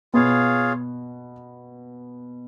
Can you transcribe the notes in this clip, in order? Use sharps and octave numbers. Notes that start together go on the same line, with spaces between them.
B2 B3 F4 G#4 C#5 F5